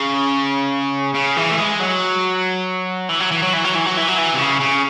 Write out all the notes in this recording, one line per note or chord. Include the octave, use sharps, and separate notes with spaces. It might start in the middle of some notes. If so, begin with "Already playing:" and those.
Already playing: C#3
C#3
E3
A3
G#3
F#3
E3
F#3
E3
F#3
E3
F#3
E3
F#3
E3
F#3
E3
C3
C#3
C#3